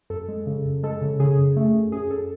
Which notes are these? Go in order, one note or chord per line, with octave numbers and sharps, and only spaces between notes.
F#2 A4
G#3
C#3
F#2
G#3 A4
C#3
C#3 G#4
F#2
A3
F#2
F#2 G#4
F#2 A4